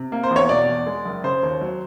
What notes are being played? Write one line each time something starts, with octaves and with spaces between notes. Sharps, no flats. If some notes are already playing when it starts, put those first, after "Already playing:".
Already playing: C3
A#3
C5
E2
C#5
B2 D5
E2
G#3
F#1
C#3 C5
D#2
F#3